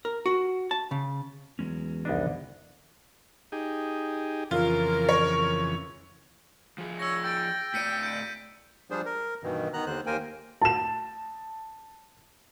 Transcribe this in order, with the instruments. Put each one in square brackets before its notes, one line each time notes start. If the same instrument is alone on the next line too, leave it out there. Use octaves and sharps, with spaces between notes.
[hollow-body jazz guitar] A#4
F#4
A5
C#3
[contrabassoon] E2 [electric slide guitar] F#3 G#3 C#4
[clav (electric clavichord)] C2 B3 D4 [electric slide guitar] F2 D#4
[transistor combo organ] D#4 G4 G#4
[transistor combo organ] F2 C#3 E3 [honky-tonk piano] F4 [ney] A#4
[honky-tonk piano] C#5
[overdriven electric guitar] F3 G#4
[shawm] C#5 [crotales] E6 A#6
[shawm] G5 [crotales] E6 A6 D7
[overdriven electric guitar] A2 D5 [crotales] B6 C#7 D#7
[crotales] G6 C#7 D7
[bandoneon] F3 G3 D4 G#4 C5
A#4
G2 B2 D#3 E3
D#3 B3 A#5 F#6
D#2 D3 C5 F#6
D#2 A#3 A#4 C5 G5 G#5
[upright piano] A5 E7